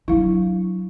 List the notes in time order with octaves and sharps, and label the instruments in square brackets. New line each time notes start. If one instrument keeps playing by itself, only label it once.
[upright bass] F#3 D4 [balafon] E4 F5